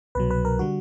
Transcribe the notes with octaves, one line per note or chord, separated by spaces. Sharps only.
C2 B2 F#3 B4
B4
A#4
D3 G3 F#4